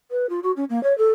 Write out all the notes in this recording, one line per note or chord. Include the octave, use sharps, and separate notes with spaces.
B4
F4
F#4
C#4
A#3
C#5
A4